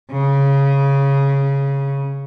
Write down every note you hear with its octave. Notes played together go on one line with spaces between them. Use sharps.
C#3